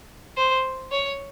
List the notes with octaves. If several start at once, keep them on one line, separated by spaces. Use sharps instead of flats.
C5
C#5